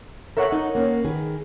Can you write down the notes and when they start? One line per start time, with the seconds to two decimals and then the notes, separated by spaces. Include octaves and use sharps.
0.37 A4 A#4 C#5 E5 F#5
0.52 D#4
0.75 A#3 C#4
1.04 D#3 G#4 B4